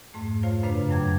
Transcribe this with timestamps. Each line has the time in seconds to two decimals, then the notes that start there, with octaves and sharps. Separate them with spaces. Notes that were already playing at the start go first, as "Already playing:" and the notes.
0.14 F2 G#2 A3
0.43 F4 C5 C#5 F5
0.63 F#2 C#3 D4 B4 C5 F5
0.90 F2 F#3 G5 A#5 D6 G#6